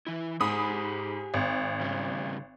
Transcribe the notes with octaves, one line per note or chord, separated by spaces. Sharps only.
E3 E4
G#2 G4 F#5 G#5 B5 D#6
G#1
C#3 G3 C#4